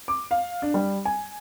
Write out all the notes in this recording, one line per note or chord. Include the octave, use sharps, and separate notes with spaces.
D6
F5
D4
G3
G#5